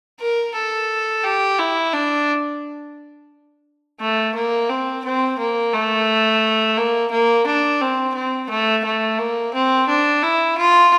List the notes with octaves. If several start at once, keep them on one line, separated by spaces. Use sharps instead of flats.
A#4
A4
G4
E4
D4
A3
A#3
C4
C4
A#3
A3
A#3
A#3
D4
C4
C4
A3
A3
A#3
C4
D4
E4
F4